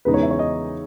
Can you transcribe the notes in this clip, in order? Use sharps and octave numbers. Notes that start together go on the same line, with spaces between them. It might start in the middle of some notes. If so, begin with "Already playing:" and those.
E2 C#3 G#3 D#4 B4
C#5
E5
C#5
D#5